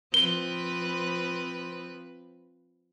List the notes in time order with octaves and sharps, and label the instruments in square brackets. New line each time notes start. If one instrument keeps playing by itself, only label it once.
[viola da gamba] F3 C4 B4 [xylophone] G7